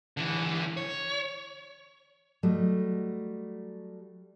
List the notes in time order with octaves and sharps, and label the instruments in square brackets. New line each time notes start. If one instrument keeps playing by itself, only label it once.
[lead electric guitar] D3 E3
C#5
[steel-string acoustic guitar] F#3 G3 A3 D#5